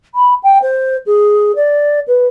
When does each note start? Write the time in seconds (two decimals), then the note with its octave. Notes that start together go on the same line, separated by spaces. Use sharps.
0.15 B5
0.43 G5
0.62 C5
1.06 G#4
1.56 D5
2.08 B4